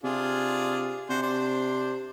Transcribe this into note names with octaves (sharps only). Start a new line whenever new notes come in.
C3 D4 F4 G#4
C3 D4 F#4 C5
D4 C5